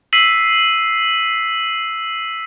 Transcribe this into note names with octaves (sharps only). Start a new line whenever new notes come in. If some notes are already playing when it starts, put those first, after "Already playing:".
E6 B6 C7 D#7 F#7